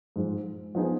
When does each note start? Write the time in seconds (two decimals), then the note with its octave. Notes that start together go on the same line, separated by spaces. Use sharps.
0.16 G#2 F3 G#3
0.75 F3 B3 D#4 G#4